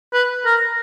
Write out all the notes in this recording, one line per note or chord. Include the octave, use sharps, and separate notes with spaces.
B4
A#4